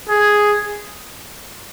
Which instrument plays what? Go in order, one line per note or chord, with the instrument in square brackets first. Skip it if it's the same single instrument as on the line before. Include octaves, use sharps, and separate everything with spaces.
[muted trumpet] G#4